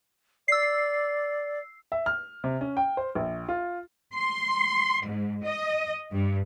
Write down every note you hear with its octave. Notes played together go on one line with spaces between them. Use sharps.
D5 E6 C7
E5
F6
C3
C#4
G5
C5
A#1
F4
C6
G#2
D#5
G2